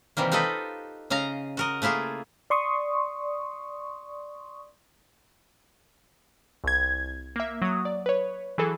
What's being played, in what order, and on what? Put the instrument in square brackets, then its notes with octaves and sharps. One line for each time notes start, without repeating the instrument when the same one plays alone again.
[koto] C3 D#3 E3 G3 A#3
D#4 F4 G4 A4 B4 D#5
C#3 D#5 F5 A#5
F#4 A#4 D#5
A3 A#3 E4 F4 G#4
[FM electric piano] D5 C6 C#6 D#6
[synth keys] C2 G#6
A#3 E5
F#3 D#6
D5
B4 C#5
E3 F#3 G#4 A4